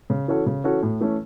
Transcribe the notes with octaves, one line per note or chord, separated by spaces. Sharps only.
C#3
E3 C#4 F#4 A4
C#3
E3 C#4 F#4 A4
A2
E3 A3 C#4